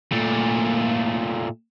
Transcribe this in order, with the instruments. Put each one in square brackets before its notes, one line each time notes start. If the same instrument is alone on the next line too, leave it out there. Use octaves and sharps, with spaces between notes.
[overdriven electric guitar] A#2 A3